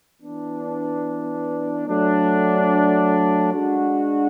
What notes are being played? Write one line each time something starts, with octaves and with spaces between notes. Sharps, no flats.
E3 B3 D4
F#3 A3 D4
G#3 D4 F#4